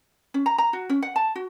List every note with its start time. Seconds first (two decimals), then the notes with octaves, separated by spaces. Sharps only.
0.34 C#4
0.46 A#5
0.58 A#5
0.73 F#4
0.89 C#4
1.03 F#5
1.16 A5
1.35 F#4